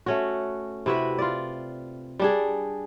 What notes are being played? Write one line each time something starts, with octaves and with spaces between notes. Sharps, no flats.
A3 C#4 F#4
C3 E4 F#4 B4
F4 D5
G3 D4 G#4